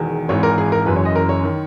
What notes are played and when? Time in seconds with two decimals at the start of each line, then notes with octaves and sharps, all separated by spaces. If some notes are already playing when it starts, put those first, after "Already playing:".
Already playing: E1 E2 D#3
0.29 G#1 G#2 E3 C#5
0.43 A#4
0.58 G#4
0.72 A#4
0.86 F#1 F#2 E3 B4
0.96 C#5
1.05 D#5
1.15 A#4
1.29 C#5
1.44 D#3